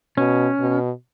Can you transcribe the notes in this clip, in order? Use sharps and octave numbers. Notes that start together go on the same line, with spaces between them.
B2 C#4
B2